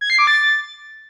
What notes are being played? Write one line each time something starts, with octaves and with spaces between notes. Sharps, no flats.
G#6
C7
D6
A6